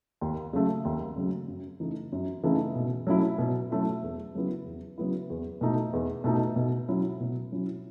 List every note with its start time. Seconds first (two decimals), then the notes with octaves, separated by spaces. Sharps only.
0.21 D#2
0.53 C#3 F#3 A3
0.85 D#2
1.16 C#3 F#3 A3
1.48 F#2
1.80 C#3 E3 A3 D#4
2.12 F#2
2.43 C#3 E3 A3 D#4
2.75 B2
3.07 F#3 A3 C#4 E4
3.38 B2
3.71 F#3 A3 C#4 E4
4.02 E2
4.35 C#3 F#3 B3 E4
4.66 E2
4.98 C#3 F#3 B3 E4
5.30 E2
5.61 B2 A3 D#4
5.93 E2
6.24 B2 A3 D#4
6.56 B2
6.88 F#3 C#4 E4
7.20 B2
7.52 F#3 C#4 E4